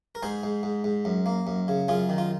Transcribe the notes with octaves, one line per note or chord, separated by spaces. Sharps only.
A#4
G#2 G#4 C5
G#2
G#2
G#2
F#2
A#3
F#2
C#3
F#2 F4 G#4
D#3
F4